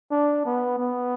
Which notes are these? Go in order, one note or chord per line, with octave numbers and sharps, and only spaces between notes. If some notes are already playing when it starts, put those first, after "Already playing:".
D4
B3
B3